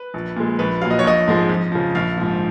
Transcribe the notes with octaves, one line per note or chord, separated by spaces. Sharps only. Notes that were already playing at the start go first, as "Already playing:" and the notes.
Already playing: B4
A#1
A#2 G#3
A#1 B4
A#2 F#3 F5
D#5
C#5
A#1 D#5
G#2 F3 G#3
F2
C#3 F3
A#1 F5
G#2 F3